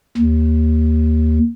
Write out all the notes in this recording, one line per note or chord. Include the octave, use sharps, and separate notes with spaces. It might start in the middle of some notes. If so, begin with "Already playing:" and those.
D#2